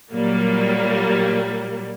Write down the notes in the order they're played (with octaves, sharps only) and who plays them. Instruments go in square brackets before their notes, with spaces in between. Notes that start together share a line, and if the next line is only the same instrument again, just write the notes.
[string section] A#2 F#3 G3 A#3